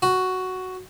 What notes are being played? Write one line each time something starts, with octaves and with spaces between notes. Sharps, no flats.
F#4